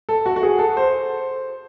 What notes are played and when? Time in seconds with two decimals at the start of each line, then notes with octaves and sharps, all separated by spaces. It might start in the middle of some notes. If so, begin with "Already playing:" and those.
0.09 A4
0.26 F#4
0.36 F#4
0.43 G#4
0.59 A4
0.77 C5